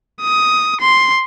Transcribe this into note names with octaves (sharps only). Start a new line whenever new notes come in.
D#6
C6